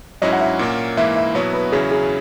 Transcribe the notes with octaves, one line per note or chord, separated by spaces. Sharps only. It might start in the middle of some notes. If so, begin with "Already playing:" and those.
G#2 F#3 C#4 E4 D#5
F#5
E5
A#2 A#3 C#4
G#2 E3 A#3 E4 E5
E5
B2 F#3 B3 E4 C#5
B4
E2 C#3 F#3 C#4 E4 G#4
G#4